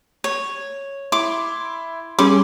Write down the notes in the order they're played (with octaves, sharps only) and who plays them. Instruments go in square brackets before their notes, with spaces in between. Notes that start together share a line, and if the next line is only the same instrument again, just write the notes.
[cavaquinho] C#5
[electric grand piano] E4 C6 [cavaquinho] D6
[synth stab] G3 C#4 G#4 [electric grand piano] B5 C6 [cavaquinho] D6